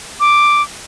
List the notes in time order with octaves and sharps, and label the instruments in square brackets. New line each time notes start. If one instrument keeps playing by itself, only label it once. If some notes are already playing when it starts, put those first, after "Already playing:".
[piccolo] D6